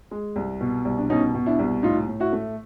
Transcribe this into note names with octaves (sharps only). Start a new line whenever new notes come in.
G#3
C2
B2
C2
D4
B2 C#4 D#4
B2
D4 E4
C2
A2 D#4 F4
A2
E4 F#4
A3